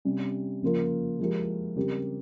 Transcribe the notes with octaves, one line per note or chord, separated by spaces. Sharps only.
C3 G3 C#4
C#3 F3 A#3 F4 A#4
F3 G#3 E4 G4 A#4
C#3 G3 C4 G4 A#4